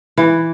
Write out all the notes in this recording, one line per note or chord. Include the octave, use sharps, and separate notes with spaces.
E3